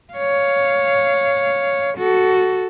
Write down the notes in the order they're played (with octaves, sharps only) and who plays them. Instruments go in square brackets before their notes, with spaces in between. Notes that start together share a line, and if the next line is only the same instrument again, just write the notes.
[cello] C#5 F5
F#4 A4